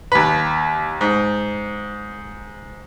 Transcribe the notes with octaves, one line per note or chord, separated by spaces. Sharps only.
D#2 B4
G#2